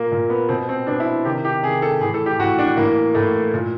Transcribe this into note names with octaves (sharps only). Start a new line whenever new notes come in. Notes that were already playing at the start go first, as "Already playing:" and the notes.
Already playing: A#2 A#3
A#2
B3
B2 C4
C4
B2 D4
E4
C3 D#3 G4
G4
C3 D#3 G#4
A4
A2 E3 G#4
A4
G4
A2 E3 F#4
D4
A2 E3 A#3
A2 E3 A3
A#2